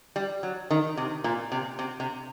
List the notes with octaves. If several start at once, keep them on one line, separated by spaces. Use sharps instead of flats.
G3
F#3
D#3
C3
A#2
C3
C3
C3